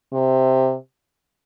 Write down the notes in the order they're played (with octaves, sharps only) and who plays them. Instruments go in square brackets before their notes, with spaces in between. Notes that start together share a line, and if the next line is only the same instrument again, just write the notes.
[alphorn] C3